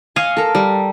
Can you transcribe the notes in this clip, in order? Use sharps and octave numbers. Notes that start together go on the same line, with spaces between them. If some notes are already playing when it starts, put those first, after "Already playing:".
D#5 F5 G#5 C#6
A4 A#4
G3